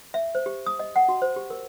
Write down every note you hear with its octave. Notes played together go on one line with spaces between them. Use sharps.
E5
C5
G4
D#6
D#5
F#5
F#4
C5
G4
A#4